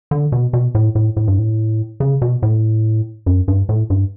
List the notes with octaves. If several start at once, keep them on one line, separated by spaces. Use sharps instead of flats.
D3
B2
B2
A2
A2
A2
G2
A2
C#3
B2
A2
F#2
G2
A2
G2